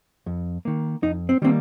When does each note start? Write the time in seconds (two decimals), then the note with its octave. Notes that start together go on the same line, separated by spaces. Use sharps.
0.26 F2
0.65 D#3 A#3
1.02 F2 D#4
1.29 C4
1.42 D#3 G3 A#3 C4